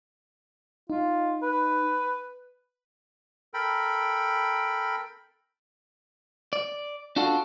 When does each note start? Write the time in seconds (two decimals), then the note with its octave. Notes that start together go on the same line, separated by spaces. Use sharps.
0.90 D#4 F4
1.43 B4
3.54 A4 A#4 G5 B5
6.53 D5
7.16 D4 F4 F#4 A4